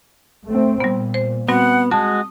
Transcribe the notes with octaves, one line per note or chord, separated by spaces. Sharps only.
A3 C4
A#2 G3 B3
C5
G3 B3 C4 F#4 F#5
G#3 F#4 A5 D#6